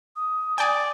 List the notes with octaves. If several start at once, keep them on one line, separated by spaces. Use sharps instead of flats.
D#6
D5 G5 G#5 D#6